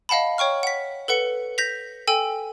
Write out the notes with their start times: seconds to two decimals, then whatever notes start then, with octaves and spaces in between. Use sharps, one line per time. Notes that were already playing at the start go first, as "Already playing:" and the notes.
0.09 D#5 F5 F#5 A5 B5
0.38 C#5 G5 C#6 F6
0.63 F#5 B6
1.08 A4 B4 F#5 C#7
1.58 G6 A#6 B6 F7
2.07 A4 G5 G#5 E6